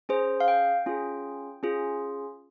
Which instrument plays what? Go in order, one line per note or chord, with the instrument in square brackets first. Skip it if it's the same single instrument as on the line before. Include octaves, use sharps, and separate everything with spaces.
[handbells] C#4 G#4 C5
F5
G5
C#4 F4 G#4
C#4 F4 G#4